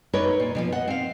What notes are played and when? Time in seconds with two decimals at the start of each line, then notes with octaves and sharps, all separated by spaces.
0.13 D#4 A#4 B4 C#5 D5
0.40 A#2
0.55 B2 E3 F3
0.72 D#5 F#5
0.88 C4 F5